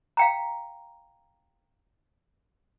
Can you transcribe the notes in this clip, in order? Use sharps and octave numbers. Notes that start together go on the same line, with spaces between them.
F5 G5 A#5